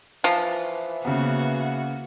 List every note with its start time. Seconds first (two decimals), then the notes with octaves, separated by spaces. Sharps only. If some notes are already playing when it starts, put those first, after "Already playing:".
0.24 E3 F3
1.05 C#3 A#3 B3 F#4